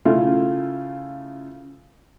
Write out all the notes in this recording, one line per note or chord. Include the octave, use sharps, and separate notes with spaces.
C#3 A3 E4 F4